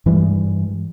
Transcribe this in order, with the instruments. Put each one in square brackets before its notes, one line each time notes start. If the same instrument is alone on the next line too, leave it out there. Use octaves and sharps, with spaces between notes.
[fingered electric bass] G2 E3 G3 G#3